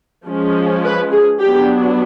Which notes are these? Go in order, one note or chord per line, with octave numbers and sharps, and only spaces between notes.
F3 G#3 C#4
B4
G#4
F#3 B3 D4 G4